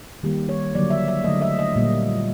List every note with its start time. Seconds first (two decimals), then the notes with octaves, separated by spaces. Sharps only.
0.23 D#3 G3 A#3 G4
0.49 C#5
0.74 D3 F#3 A#3 D5
0.90 E5
1.08 E5
1.24 D3 F#3 A3 D#5
1.42 E5
1.59 D#5
1.76 A#2 G3 A#3